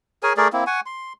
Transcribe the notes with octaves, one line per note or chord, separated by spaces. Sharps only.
G#4 A#4 C#5 G#5
A3 G#4 A#4 D5
A#3 C4 E4
F#5 G#5 C#6
C6